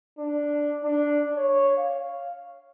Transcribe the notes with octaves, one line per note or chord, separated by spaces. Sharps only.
D4
D4
C#5
F5